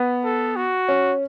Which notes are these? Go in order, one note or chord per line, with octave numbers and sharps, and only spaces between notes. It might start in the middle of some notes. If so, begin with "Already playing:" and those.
Already playing: B3
A4
F#4
C#4